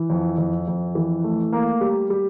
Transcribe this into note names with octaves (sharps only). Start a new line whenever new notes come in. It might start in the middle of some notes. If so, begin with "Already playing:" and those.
Already playing: E3
F2
F2
F2
E3
A3
A#3
G3
G3